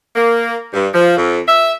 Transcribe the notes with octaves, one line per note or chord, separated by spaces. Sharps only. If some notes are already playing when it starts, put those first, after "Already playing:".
A#3
G2
F3
F2
E5